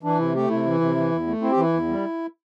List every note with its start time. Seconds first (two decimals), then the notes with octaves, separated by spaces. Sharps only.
0.03 E3 D4
0.19 C3 E4
0.35 A3 G4
0.50 C3 E4
0.66 E3
0.81 C3
0.96 E3
1.12 E2
1.27 A3
1.42 C4 E4
1.51 G4
1.57 E3 E4
1.73 E2
1.89 G3